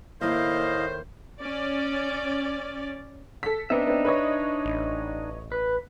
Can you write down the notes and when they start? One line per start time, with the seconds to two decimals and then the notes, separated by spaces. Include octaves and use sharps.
0.21 D#2 A2 A#3 E4 C5 D#5 F5
1.40 C#4 D5
3.43 A4 B6
3.70 B3 C4 D4 D#4 E5
3.87 B3 C4
4.05 B4 C#5 D#5
4.65 A1
5.52 B4